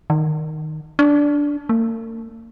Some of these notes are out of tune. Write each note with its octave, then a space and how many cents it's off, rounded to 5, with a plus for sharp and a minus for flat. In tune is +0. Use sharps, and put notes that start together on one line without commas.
D#3 -5
D4 -10
A#3 -45